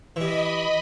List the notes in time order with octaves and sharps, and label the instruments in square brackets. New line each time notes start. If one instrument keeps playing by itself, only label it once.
[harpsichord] E3 G3 [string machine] D#5 B5